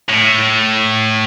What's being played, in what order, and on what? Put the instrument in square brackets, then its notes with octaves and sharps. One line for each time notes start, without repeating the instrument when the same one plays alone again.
[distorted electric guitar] A2